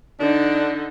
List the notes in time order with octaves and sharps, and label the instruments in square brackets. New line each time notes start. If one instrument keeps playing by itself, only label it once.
[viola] D3 D#4 [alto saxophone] D4